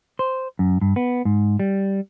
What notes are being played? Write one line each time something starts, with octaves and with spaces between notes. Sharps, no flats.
C5
F#2
G2
B3
G#2
G3